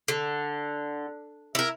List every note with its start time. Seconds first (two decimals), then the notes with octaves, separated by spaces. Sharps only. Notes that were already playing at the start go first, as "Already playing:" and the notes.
0.08 D3
1.55 E4 A#4